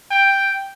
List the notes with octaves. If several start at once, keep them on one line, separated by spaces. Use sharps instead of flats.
G5